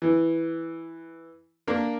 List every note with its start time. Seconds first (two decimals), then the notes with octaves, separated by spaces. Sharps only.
0.02 E3
1.67 A#3 D4 A#4